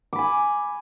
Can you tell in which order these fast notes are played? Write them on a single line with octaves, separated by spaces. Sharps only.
D6 B5 G#5